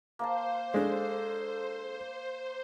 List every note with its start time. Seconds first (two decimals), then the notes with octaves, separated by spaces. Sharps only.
0.19 A#3 C5 F5 A5
0.74 G#3 D4 A4